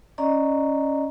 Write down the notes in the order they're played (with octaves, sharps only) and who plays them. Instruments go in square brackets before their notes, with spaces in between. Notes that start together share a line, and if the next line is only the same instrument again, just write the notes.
[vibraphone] C#4 D5 D#5 A#5